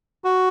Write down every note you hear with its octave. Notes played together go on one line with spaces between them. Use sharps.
F#4